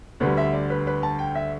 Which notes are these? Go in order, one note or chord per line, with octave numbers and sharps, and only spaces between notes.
D2 D3 G3 B4
E5
D5
B4
B4
A5
G5
E5